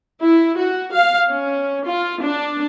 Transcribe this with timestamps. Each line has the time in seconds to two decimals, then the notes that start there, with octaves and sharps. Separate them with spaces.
0.21 E4
0.57 F#4
0.92 F5
1.29 C#4
1.85 F4
2.23 D4